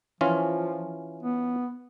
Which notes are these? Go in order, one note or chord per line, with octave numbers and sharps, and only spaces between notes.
E3 F3 C#4 F4
B3